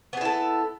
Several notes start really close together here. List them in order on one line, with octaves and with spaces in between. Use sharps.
B3 G#4 E4 A4